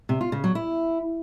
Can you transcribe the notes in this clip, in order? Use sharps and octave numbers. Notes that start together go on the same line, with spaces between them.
C3
F4
C#3
F#3
E4